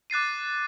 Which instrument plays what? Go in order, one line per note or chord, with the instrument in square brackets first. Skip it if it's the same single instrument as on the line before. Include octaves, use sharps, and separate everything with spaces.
[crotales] D6 F#6 A6 C7 D#7